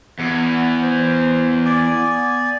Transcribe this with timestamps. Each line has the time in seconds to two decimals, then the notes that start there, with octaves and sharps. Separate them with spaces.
0.19 E2 F#5
0.82 C5
1.66 D5 G#5 D6
1.94 B3